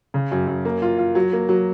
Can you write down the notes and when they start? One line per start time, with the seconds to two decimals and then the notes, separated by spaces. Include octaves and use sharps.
0.14 C#3
0.32 F#2
0.47 F#2
0.65 A#3
0.82 F4
0.98 F4
1.15 F#3
1.33 A#3
1.49 F#3